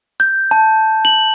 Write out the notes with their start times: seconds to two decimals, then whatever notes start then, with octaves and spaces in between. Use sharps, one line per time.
0.20 G6
0.51 A5
1.05 F#7